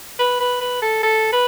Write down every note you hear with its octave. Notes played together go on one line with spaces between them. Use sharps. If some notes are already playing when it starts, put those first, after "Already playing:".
B4
B4
B4
A4
A4
B4